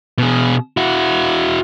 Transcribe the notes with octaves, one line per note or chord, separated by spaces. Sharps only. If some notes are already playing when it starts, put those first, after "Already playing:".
B2 G#4
E4 F#4